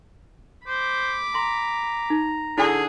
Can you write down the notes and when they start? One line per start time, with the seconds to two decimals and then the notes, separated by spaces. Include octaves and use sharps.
0.67 C5 B5 D6
1.34 A#5 C6
2.10 D#4
2.58 D3 E4 G#4 G#5 C#6